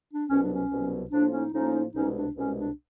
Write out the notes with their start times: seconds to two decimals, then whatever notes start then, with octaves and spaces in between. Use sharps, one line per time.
0.10 D4
0.30 C2 B2 F#3 B3 C#4
0.41 D4
0.52 C#4
0.71 C2 B2 F#3 B3
1.11 A2 F3 A#3 D4
1.32 C#4 D#4
1.52 A2 F3 A#3 C#4 D#4
1.93 C2 B2 G#3 C#4 D#4
2.15 D4
2.34 C2 B2 G#3 C#4
2.56 D4